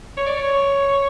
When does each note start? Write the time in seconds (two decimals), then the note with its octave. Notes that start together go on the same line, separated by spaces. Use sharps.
0.18 C#5
0.26 D5
0.37 C#5